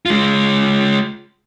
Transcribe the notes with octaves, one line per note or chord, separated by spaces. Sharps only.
G#3 F4